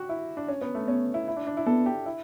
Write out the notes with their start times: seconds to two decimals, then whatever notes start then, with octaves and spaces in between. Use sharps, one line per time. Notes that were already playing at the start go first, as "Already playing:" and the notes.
Already playing: F#4 G4
0.09 E4
0.37 D4
0.48 C#4
0.61 B3
0.75 A3
0.88 B3 C#4
1.14 E4
1.28 E4
1.37 D4
1.47 D4
1.57 E4
1.66 B3 A4
1.86 G4
2.06 E4